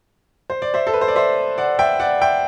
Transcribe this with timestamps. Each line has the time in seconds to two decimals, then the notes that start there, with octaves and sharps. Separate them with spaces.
0.50 C5
0.62 D5
0.74 C5 E5
0.87 A4
0.94 B4
1.01 C5
1.08 D5
1.16 C5 E5
1.58 D5 F#5
1.79 E5 G5
2.00 D5 F#5
2.21 E5 G5